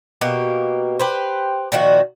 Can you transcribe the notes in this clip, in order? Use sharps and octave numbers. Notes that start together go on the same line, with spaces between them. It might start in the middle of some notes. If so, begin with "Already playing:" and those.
B2 A#3 G4
G4 B4 C5
A#2 D#3 F3 F#4